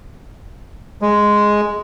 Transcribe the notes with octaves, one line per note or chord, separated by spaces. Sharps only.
G#3